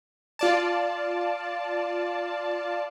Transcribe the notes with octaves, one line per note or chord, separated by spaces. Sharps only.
F4 D5 A5